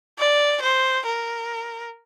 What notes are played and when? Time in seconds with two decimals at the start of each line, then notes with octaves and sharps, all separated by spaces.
0.19 D5
0.62 C5
1.06 A#4